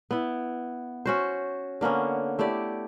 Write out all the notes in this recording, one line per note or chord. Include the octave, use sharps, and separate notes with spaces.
B3 E4
C#4 F#4 C5
D3 A#3 B3 C#4
A3 E4 G4 D5